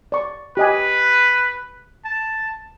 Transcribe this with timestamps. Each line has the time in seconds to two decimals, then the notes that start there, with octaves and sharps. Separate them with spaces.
0.12 D5 C#6
0.57 G4 B4 D#5 G#5
2.05 A5